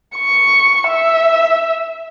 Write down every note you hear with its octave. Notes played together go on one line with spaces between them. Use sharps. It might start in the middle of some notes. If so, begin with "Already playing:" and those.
C#6
E5